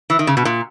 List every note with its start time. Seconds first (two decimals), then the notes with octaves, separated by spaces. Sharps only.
0.10 E3
0.19 D#3
0.27 C#3
0.37 B2
0.45 A#2